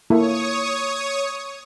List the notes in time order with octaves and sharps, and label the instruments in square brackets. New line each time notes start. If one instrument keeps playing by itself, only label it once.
[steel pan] A#3 E4 A4 [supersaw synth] C#5 C#6 D#6